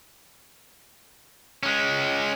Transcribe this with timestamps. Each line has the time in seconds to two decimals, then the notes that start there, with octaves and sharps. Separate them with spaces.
1.63 G#3 C#4